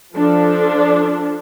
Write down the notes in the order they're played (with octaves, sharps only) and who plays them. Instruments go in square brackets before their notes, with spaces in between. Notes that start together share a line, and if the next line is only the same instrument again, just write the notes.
[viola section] F3 D4 A4